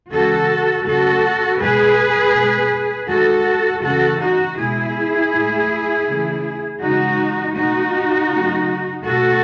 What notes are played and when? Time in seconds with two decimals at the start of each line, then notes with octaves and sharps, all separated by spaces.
0.11 C#3 E3 G#3 F#4 A4
0.85 C#3 F#3 A3 F#4 A4
1.60 B2 G#3 G#4 B4
2.35 B2 G#3
3.08 D#3 G#3 F#4 A4
3.83 C#3 E3 A3 F#4 A4
4.21 D#4 F#4
4.57 B2 G#3 E4 G#4
5.32 A2 G#3
6.07 C#3 E3 A3
6.82 C#3 E3 G#3 D#4 F#4
7.56 B2 A3 D#4 F#4
8.30 C#3 F#3 A3
9.05 B2 A3 F#4 A4